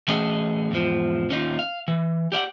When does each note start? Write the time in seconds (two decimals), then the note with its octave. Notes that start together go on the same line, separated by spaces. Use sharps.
0.08 E3 A3 C#4 F#4 G#4 D#5
0.71 E2 G#2 F3
1.29 D#2 C#4 D#4 F4
1.59 F5
1.88 E3
2.32 G4 D5 F5 F#5